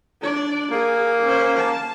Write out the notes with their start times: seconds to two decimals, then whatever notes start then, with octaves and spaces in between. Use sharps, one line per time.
0.21 D4 D5
0.71 A#3 G#4
1.23 C#4 C5
1.57 A5